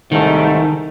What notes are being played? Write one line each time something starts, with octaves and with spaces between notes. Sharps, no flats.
C2 G#2 D#3 A3